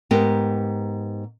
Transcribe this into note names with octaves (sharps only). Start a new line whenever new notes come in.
G#2 B3 G4 A#4